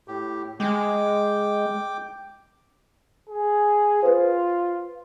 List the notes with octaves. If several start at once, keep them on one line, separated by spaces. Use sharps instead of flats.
A2 G4
G#3 G5 D6
G#4
F4 B4 C5